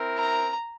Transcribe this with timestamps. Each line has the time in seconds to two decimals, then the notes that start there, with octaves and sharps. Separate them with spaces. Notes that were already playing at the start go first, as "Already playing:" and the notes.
Already playing: C4 E4 A#4
0.17 A#5